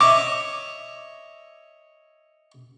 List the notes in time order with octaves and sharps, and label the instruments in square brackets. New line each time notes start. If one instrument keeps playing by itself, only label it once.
[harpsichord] C#5 D#5 E5 [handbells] D6